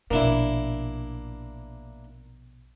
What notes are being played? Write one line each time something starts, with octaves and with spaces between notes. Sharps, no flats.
A#1 B2 A#3 D4 E4